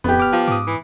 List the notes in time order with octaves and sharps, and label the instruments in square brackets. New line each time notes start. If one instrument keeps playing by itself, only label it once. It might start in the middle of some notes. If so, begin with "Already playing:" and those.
[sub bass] D1 [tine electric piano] F2 [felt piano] B3 G4
[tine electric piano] D6 F6
[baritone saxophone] F3
[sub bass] G#2 [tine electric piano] D6 D#6
[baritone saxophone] E3